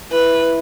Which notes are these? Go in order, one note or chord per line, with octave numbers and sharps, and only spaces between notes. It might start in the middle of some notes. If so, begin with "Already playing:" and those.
E4 B4